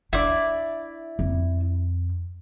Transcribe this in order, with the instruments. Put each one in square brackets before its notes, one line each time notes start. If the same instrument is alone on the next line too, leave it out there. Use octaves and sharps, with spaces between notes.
[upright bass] D4 [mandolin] E4 D5
[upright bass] F2